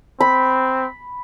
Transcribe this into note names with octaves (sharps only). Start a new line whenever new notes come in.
C4 B5